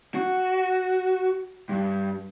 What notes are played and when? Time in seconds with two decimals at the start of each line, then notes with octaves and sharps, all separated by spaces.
0.15 F#4
1.69 G2